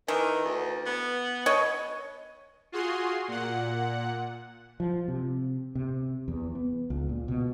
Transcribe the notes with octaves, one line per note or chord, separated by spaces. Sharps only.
D#3 E3
D2
B3
B2 C#5 D#5
F4 F#4 G#4 C6
A#2 F#5
F3
C3
C3
E2
B3
C#2
A#2
B2